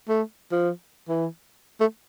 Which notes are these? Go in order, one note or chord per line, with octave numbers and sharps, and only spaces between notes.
A3
F3
E3
A3